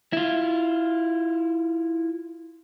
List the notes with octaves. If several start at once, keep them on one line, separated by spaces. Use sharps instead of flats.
E4 F4